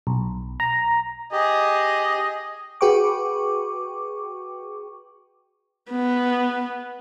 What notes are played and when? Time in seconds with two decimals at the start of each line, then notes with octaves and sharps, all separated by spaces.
0.07 B1
0.60 A#5
1.32 G4 G#4 D#5
2.81 F#4 G#4 B4 G5 C#6 D6
5.91 B3